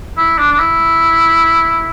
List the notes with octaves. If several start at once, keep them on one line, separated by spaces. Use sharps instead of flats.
E4
D4
D4
E4